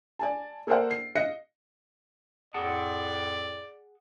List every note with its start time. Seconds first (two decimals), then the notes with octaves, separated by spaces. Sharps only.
0.19 D5 G#5 A5
0.67 A#3 A4 A#4 C5 D5 F#5
0.91 C7
1.15 D#5 F5 F#6 A#6 C#7
2.54 F2 A2 G#4 D5 F#5 A5